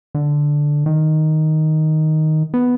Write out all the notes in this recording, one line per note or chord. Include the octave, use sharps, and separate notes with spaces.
D3
D#3
B3